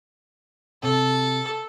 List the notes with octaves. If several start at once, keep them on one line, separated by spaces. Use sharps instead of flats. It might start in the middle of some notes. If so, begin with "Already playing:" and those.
C3 A4